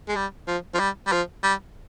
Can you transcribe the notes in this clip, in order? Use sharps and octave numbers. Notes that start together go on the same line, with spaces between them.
G#3
G3
F3
F3
G3
G3
F3
G3